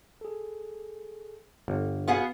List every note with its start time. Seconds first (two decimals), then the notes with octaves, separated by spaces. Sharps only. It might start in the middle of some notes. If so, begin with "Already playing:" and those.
0.21 G#4 A4
1.68 G1 D3
2.08 B3 F#4 G#4 F5 F#5 C7